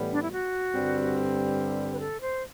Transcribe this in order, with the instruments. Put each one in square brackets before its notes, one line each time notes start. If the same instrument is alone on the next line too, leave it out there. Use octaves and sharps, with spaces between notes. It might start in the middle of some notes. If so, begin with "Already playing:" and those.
Already playing: [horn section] A2 E3 G3 B3
[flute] D4
E4
F#4
[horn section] G2 D3 G3 C4
[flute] B4
A4
C5